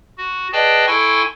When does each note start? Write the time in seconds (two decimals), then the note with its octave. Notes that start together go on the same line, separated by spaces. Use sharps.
0.18 F#4
0.53 G#4 B4 D5 D#5 G5 A5
0.87 E4 A4 G5 G#5 C6 C#6